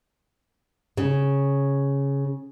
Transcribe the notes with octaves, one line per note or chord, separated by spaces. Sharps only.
C#3